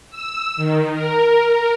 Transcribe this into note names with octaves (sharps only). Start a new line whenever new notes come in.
E6
D#3
A#4